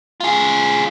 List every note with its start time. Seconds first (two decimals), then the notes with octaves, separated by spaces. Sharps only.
0.20 F4 G#4